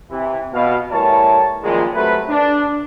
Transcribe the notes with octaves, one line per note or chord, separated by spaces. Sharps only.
C3 E3
B2 F5
A2 E3 G3 A#4 C#5 A5
F#2 A#2 D#3 F3 G3 G#3
F#3 A3 C4 G4 B4
D4